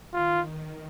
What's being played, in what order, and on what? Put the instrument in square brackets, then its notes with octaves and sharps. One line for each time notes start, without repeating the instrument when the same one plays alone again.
[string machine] D#3 [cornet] F4